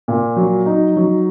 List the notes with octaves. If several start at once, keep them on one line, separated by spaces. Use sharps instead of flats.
A#2
F#3
D#4
F#3